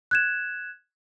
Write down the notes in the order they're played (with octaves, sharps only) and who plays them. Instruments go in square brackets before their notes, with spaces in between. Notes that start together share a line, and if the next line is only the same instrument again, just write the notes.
[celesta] F#6 G#6 E7